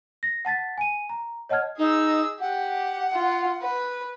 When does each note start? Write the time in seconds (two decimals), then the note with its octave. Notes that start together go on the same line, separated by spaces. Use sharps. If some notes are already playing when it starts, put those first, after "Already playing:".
0.23 A#6
0.45 F#5 A5 A6 B6
0.78 G#5 D#7
1.09 A#5
1.49 C#5 D#5 F#5 A5 F6 G#6
1.78 D#4 G#4 E6
2.40 G4 F#5
3.12 F4
3.61 B4